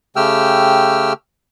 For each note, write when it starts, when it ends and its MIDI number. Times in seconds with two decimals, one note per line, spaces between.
0.16 1.13 49
0.16 1.13 57
0.16 1.13 67
0.16 1.13 79
0.16 1.13 88
0.16 1.13 89